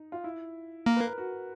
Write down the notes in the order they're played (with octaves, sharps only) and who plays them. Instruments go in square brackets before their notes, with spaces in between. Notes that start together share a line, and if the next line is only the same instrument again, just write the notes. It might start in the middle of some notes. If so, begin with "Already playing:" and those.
Already playing: [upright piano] D#4
F4
E4
[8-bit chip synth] A#3 [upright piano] A#4
[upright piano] B4
A#4
F#4